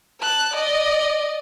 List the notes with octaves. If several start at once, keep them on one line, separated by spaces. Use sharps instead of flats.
A5 F#6
D5 D#5